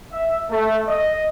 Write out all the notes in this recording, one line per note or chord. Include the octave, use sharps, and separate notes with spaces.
E5
A3
D#5